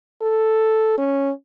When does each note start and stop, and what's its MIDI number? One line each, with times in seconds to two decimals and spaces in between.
0.22 0.98 69
0.98 1.31 61